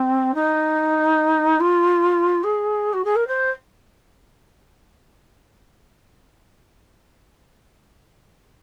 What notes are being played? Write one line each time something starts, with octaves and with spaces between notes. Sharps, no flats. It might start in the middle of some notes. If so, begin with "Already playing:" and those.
Already playing: C4
D#4
F4
G#4
F#4
G#4
A#4
C5